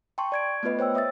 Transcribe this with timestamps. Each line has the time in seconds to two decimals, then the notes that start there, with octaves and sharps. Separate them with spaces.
0.18 G5 A5 C6 C#6
0.32 D5 G#6 D7
0.63 A3 B3 F4 B4 D#5
0.79 C5 C#5 G5 E6
0.94 C#5 E5 D#6 E6 A6